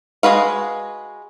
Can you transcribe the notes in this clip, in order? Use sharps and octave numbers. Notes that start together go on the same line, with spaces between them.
G#3 F#4 B4 F5